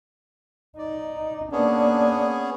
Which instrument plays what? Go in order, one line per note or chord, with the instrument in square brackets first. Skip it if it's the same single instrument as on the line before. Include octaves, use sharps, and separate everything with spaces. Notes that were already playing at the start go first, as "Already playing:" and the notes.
[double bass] D#4 [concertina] D5
[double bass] A#3 D4 [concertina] B3 C#4 G#4